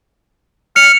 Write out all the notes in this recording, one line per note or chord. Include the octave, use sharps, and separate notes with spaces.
F6 C#7